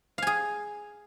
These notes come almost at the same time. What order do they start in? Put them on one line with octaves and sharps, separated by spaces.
F5 G#5 G#4